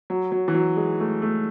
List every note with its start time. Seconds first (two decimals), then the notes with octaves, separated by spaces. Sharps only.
0.10 F#3
0.32 F#3
0.48 E3
0.54 F#3
0.76 G#3
1.00 A3
1.22 A3